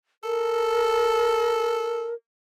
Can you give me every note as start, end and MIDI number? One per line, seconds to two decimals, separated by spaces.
0.24 2.09 69
0.24 2.14 70